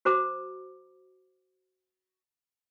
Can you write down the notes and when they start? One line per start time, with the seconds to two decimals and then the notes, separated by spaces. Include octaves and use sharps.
0.05 F#4 C5 A#5 D6